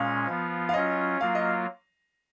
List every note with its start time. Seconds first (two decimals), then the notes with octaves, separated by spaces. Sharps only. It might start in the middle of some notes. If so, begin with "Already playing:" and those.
Already playing: A#2 G#3 C#4 F5
0.27 F3 B3 F4
0.69 F5
0.74 F#3 C#4 F4 D#5
1.20 F#3 A#3 F4 F5
1.35 D#5